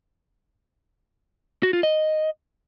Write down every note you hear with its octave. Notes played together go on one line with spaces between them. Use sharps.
F#4
F4
D#5